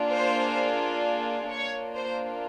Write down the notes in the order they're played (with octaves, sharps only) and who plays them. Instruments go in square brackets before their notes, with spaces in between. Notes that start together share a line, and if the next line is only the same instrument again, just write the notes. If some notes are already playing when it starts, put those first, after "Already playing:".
Already playing: [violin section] A#3 D4 F4 G#4
C5
A#3 D4 F4 C#5
C5